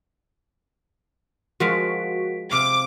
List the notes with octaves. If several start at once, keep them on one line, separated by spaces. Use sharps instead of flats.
F3 G#3 F#4 A#4 F5 B6 D7
C3 F5 D6